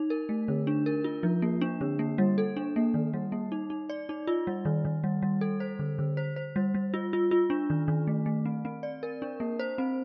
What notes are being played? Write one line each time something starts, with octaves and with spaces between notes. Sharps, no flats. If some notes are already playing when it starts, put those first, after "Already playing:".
Already playing: D#4
A#4
A3
D3
D4
A#4
F4
F3
A#3
D4
D3
A#3
G3
A4
D4
A#3
D#3
G3
A#3
D#4
D#4
D5
D#4
F4
G3
D#3
D#3
G3
G3
A4
C5
D3
D3
C5
C5
G3
G3
F4
F4
F4
D4
D#3
D#3
A3
A3
C4
C4
D5
A#4
D4
A#3
C5
C4